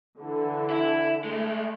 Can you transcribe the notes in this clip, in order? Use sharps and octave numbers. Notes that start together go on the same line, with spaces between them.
D3 E3
E4
G#3 A3